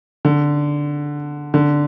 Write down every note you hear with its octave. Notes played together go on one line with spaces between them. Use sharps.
D3
D3